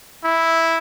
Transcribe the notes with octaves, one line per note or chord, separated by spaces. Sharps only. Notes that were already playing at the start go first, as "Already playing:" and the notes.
E4